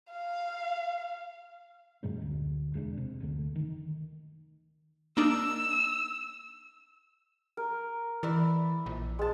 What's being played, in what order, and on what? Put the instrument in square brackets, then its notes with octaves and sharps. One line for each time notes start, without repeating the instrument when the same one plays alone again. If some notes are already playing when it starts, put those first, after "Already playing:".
[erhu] F5
[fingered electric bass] F#2 A#2 G#3 C#4
D2
E1 G#3 B3 D4
C3
F#1 D2 A3
D#3
[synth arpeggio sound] A#3 D4 D#4 [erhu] E6
[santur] A#4
[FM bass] E3 [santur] D5 E5 B5
[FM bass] A#1
[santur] G#3 A5